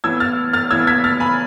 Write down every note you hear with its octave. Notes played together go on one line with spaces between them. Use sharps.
A2 E3 B3 E6 G#6
F6 A6
F6 A6
A2 E3 B3 E6 G#6
G#6 B6
F6 A6
G#5 B5